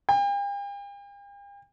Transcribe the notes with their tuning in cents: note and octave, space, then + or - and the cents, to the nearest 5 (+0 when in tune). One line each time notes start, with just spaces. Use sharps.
G5 +45